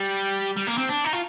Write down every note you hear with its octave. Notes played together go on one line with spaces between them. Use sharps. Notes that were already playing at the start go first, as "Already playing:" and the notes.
Already playing: G3
G3
A#3
C4
D4
D#4
F4